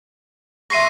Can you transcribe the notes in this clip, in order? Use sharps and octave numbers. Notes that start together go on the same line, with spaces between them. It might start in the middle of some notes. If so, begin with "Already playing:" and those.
E5 C6 C#6 A#6 C7 D#7